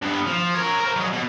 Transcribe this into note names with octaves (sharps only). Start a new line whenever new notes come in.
G2 B3
F3
A#4 C#5
A#4 C5
F#3 G#3
B2